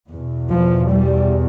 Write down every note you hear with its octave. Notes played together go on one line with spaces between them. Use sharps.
E2 B2
F3
G3